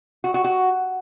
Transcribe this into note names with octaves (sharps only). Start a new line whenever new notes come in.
F#4
F#4
F#4